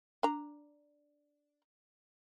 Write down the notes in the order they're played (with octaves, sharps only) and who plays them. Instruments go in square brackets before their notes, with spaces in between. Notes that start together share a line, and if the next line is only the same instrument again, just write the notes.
[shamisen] D4 A#5